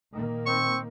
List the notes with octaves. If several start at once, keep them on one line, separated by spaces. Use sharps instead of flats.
A#2 D#3 A#3
C4 C#6